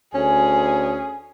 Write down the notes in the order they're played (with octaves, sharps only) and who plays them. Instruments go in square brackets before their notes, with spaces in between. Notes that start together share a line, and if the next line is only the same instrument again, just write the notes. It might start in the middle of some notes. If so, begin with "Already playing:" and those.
[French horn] D2 [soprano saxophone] C#4 [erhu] G#4